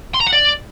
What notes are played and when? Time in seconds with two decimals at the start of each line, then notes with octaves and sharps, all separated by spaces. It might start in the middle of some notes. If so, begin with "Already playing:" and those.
0.14 C6
0.20 A#5
0.26 F#5
0.33 D5